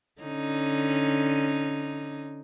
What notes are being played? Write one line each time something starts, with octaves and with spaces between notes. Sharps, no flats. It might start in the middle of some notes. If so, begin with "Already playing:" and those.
D3 C#4 D#4